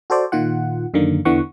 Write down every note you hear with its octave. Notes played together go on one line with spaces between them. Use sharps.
F#4 A4 C5 D5
A#2 D#3 F4 F#5
F#2 D3 D#3 A#3
E2 D3 E3 B3 F#5 C#6